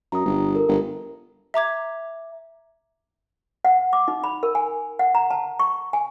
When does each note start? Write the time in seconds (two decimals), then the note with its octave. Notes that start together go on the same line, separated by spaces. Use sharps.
0.12 F#2 A#5 D#6
0.25 G1
0.55 A4 A#4
0.68 G1
1.54 E5 A#5 D6 G#6
3.65 F#5
3.93 D6
4.08 D#4
4.24 B5
4.43 A#4
4.55 G#5
4.99 F#5
5.15 A#5
5.31 A5
5.59 C#6
5.93 G#5